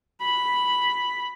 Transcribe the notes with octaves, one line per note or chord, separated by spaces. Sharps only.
B5